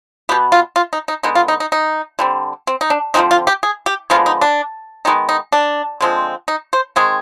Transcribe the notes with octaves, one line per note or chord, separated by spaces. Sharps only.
B2 B3 G4
F4
F4
D#4
D#4
D3 G#3 B3 D#4
F4
D#4
D#4
D#4
D3 G3 C4
C4
D#4
D4
D3 F3 G#3 C4 D#4
F4
G4
G#4
G4
D3 F3 G#3 B3 F4
D#4
D4
D#3 G#3 B3 D#4
D#4
D4
D3 F3 G#3 C4
D#4
C5
D#3 G#3 C4 G#4